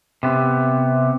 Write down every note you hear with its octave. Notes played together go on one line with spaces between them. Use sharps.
C3 B3